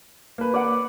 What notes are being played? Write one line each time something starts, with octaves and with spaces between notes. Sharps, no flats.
A#3 B4
D5 F#5